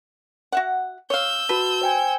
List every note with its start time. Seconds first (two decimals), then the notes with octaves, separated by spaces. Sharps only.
0.52 F#4 E5 F#5
1.10 C#5 F5 E6 G6
1.49 F#4 B4 A5
1.81 C5 G5 G#5